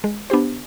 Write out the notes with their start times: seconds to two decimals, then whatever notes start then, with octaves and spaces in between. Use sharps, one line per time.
0.04 G#3
0.30 B3 D4 G4 C5